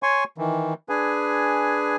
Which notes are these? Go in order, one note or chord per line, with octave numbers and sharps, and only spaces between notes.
C#5 G#5 C6 C#6
D#3 E3
D4 G#4 B4 G#5